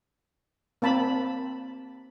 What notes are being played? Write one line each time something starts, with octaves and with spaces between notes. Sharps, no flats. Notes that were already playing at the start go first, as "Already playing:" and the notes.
A#3 C4 A5 B5